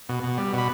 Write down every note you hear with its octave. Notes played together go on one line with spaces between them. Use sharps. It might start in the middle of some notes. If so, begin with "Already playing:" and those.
B2
B2
G3
B2 B5